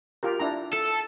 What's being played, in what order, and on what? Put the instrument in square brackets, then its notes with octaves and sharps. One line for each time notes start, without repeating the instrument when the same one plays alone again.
[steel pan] F4 G4 A#4
D4 E4 A#5
[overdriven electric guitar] A4